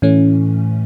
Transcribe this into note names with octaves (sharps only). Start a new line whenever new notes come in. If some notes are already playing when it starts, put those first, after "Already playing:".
A2 E3 A3 C#4